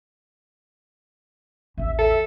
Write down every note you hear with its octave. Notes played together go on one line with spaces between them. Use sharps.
A1 D#2 E5
A4 E5